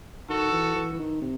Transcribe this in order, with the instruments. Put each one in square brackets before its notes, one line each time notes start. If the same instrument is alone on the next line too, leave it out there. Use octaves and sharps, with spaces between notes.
[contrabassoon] D#3 [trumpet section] F#4 A4
[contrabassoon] E3
E3
E3
D#3
C3